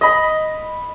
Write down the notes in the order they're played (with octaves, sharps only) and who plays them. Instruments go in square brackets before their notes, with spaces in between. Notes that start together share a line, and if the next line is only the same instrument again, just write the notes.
[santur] D#5 B5